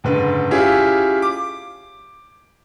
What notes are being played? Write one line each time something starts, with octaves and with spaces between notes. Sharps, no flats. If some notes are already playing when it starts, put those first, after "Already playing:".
F#1 G#2 D3 B4
C#4 E4 F4 G4 G#4
D6